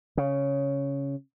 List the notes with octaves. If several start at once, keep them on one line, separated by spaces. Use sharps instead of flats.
C#3